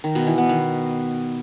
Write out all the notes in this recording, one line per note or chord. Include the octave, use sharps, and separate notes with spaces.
D#3
B2
E3
B3
D#3